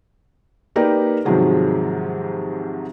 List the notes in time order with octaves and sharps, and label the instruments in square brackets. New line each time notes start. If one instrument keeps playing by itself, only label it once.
[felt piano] A#3 D#4 G4 A#4 B4 D5
G#2 C3 D#3 F3 F#3 G#3